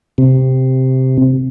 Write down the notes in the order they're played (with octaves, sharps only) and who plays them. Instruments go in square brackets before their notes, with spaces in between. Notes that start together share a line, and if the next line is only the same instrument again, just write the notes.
[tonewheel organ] C3